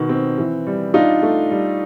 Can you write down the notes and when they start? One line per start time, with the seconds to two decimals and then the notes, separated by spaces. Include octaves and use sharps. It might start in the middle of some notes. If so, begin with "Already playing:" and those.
Already playing: B2 D#3
0.09 C4
0.38 E3
0.67 G3
0.94 D4 D#4 F4
1.23 A3
1.51 G3